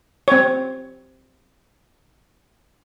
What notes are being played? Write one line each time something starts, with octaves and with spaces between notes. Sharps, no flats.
C4 C#5